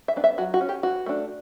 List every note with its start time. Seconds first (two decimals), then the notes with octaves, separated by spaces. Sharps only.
0.08 E5
0.16 B3 D4
0.24 E5
0.38 F#3 F#4
0.54 F#4
0.61 C#4
0.69 G4
0.83 E3 F#4
1.06 A3 D4